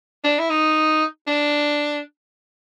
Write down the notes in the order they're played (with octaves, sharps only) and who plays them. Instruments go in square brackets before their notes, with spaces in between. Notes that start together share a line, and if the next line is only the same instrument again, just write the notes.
[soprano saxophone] D4
E4
D#4
D4